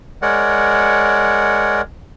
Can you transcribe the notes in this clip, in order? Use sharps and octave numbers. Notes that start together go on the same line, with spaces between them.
G#3 A#4 C#5 D5 F#5